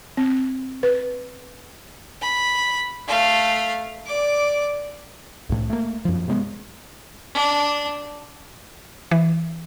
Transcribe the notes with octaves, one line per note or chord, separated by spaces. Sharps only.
C4
B4
B5
A3 F5
D5 D6
C2 A2
A3 A#3
F#2 F3
C3 F#3 G#3 B3
D4
E3